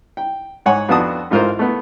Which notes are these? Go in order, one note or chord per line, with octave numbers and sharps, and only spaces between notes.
G5
G#2 C#5 F#5 G#5
F2 B3 D4 F#4 A5 D#6
A1 G#2 F4 A#4 C5
A3 B3